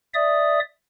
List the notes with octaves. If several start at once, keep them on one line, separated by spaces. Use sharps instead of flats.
D5 E5 D#6